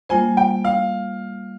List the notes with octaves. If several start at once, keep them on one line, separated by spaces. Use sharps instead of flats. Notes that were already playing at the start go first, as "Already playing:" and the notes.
G3 A#3 F4 C5 G#5
G5
F5